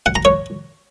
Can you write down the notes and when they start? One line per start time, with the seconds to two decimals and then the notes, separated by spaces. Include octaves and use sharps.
0.06 F#5
0.16 A#5
0.25 C#5